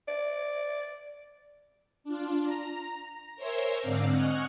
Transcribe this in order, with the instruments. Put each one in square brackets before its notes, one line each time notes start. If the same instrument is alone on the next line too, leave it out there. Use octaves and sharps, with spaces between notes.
[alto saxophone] D5
[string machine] D4 F4
A#5
A#5
A#4 C5 C#5 E5 G#5
G#2 D3 C4 D5 F5 A#5
D#5 F#5 G#5 C#6 F6 F#6